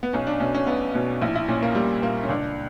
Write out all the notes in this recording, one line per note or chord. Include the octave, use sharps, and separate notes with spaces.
B3
B1 C#4
D4
B2 C#4
C#4
B1 B3
B2 C#4
A#1 E4
E4
A#2 C#4
A#3
A#1 G3
A#2 A#3
C#4
C#2 D4